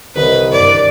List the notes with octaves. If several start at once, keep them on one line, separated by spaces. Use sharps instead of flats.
C2 D#3 B4
G2 D5